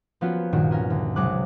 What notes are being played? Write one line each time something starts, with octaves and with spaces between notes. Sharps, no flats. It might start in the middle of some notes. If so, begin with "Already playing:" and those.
F3 A#3 B3 C#4 F4 F#4
C2 G2 A#2 D#3 F#4 D7
C#4 A#4
D2
B1 C3 F#3 G#3 D6 F#6